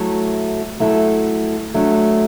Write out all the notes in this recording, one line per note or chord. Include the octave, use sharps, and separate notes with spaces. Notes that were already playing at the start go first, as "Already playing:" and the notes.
Already playing: F#3 A3 E4 A4
F#3 A3 E4 A4
F#3 A3 D4